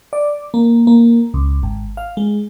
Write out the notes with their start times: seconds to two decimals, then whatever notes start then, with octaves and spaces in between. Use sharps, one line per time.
0.13 D5
0.54 A#3
0.87 A#3
1.34 C#2
1.63 G#1
1.97 F5
2.17 G#3